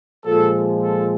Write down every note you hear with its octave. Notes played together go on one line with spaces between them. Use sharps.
A#2 F3 G#3 A4
A4